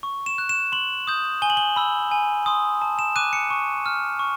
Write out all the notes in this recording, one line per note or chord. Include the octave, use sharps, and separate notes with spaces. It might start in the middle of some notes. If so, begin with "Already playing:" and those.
C#6
E7
F#6
E7
C6 F#7
D#6 G6
G#5 G7
F#7
G7
B5 E6
G#5
C6 D#6
A5
E7
D6 F#6 D#7
C#7
C#6
F6
C#6